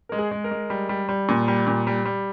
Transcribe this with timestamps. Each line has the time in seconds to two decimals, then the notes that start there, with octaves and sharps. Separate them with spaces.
0.09 G#3 A#4
0.19 G#4
0.31 G#3
0.44 A#4
0.51 G#3
0.70 G3
0.89 G3
1.09 G3
1.29 A#2
1.48 G3
1.67 A#2
1.87 G3
2.05 G3